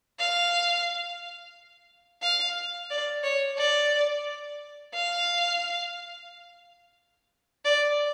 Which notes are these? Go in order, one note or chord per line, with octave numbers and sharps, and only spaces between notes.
F5
F5
D5
C#5
D5
F5
D5